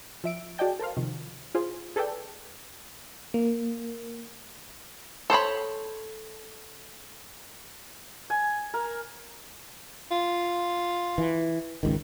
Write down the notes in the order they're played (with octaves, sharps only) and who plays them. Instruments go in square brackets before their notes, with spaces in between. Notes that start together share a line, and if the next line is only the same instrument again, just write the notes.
[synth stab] F3 E5 D7
F#4 G#4 D5 D#5 G5 A5
A4 A#4 C5 F5
C3 D#3 F3
F4 G#4 C5
G#4 A4 B4 D5 G5
[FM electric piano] A#3
[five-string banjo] A4 C5 C#5 B5
[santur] G#5
A#4
[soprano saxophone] F4
[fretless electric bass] E3
G#1 C#2 D#3